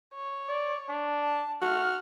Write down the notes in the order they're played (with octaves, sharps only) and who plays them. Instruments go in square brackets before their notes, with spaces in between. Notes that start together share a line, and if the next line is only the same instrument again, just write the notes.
[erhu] C#5
[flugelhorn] D5
D4
[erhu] A5
[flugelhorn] A3 [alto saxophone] F#4 [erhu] F6